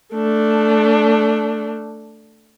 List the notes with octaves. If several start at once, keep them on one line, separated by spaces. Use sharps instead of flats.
A3 D4